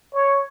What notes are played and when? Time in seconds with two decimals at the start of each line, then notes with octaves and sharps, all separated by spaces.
0.13 C#5